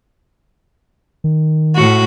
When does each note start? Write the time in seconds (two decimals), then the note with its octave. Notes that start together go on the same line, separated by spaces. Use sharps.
1.24 D#3
1.75 A2 F#4